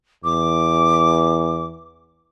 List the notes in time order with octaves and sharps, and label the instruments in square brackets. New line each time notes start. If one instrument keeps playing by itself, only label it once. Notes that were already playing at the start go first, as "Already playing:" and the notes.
[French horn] E2 [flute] D6